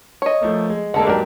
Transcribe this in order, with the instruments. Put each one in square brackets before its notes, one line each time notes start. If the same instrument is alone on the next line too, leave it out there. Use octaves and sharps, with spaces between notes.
[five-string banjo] C#5 D#5
[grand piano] F3 A3 A#3
G#3
[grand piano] D3 G#3 A#3 [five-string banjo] A4 F#5
[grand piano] G#2 F#3 G4 [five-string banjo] D4 A#4